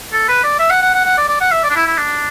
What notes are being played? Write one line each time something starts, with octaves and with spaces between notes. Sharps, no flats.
A4
B4
D5
E5
F#5
F#5
F#5
F#5
D5
D5
F#5
E5
D5
D4
E4
E4
D4